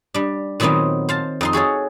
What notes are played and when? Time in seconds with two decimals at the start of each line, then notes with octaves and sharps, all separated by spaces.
0.14 G3 D4
0.60 A#2 D#3 F#3 B3 C4 D#4
1.09 C5 F5 A5
1.41 F2 D#4 C6
1.53 F#4 G#4 A4 C#5